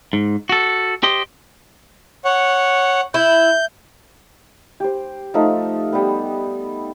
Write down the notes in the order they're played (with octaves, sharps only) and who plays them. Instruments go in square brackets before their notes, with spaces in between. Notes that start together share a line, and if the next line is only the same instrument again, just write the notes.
[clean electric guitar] G#2
F#4 A4
G4 C5 D#5
[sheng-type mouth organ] C#5 F#5
[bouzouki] E4 [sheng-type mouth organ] G6
[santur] G4 C5
F3 A3 D#4
G3 B3